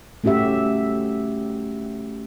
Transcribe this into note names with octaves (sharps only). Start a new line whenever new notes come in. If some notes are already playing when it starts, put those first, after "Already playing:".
A3 C#4 F#4 G4 E5